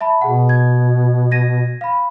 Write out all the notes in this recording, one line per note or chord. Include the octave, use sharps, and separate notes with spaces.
E5 A5 B5
B2 G#4 F#5
G#6
G#6 A#6 D#7
F5 B5